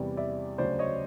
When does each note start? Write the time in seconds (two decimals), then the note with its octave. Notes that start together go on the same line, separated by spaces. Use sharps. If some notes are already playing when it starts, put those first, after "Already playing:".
Already playing: E2 C3 E3 G3 D5
0.17 D5 E5
0.58 D2 C#3 F#3 C5 D5
0.79 C#5 D#5